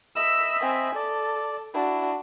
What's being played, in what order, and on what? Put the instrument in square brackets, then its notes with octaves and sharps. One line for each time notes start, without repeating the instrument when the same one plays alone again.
[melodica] D#5 E5 B5 [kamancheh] E6
[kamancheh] C4 G#5
[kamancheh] A4 [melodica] D5
[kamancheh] D4 F#4 [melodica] E4